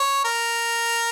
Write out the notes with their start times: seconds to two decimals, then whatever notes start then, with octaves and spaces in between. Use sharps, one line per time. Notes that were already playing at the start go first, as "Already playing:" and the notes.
Already playing: C#5
0.25 A#4